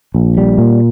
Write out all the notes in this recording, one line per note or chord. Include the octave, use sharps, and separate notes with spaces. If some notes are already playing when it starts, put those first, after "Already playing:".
A#1
G3
A#2